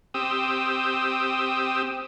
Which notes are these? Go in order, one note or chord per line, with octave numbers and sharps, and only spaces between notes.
C4 G4 D#6 E6